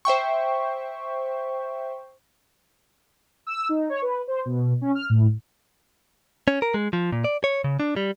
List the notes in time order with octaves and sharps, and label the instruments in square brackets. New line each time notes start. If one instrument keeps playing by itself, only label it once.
[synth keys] C5 E5 G5 C#6
[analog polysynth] E6
D#4
C#5
B4
C5
B2
C#4
F6
A2
[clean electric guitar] C#4
A#4
G#3
F3
A#2
D5
C#5
C#3
D4
G3